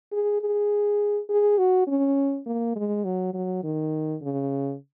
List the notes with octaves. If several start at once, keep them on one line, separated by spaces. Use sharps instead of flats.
G#4
G#4
G#4
F#4
C#4
A#3
G#3
F#3
F#3
D#3
C#3